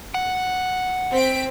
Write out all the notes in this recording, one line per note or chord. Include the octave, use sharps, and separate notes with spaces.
F#5
C4 B6 D7